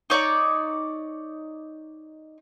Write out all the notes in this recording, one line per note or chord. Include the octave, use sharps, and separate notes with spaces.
D#4 C#5 D5 A#5